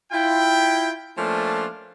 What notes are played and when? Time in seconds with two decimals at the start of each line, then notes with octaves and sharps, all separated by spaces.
0.12 E4 F4 G5
1.17 F3 A3 A#3 C#4 D4 F4